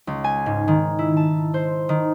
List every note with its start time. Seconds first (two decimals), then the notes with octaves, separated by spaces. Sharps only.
0.07 C#2
0.24 G#5
0.46 G#2
0.68 D#3
0.99 E4
1.17 A5
1.54 C5
1.89 D#3